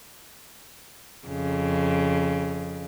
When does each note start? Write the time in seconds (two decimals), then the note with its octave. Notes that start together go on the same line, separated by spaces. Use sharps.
1.28 F2 C#3